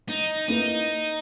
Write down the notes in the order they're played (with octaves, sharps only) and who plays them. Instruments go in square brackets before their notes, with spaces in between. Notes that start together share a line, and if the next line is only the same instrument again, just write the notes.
[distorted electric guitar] D#4
[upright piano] A#3 E4 B4 [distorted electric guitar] D#4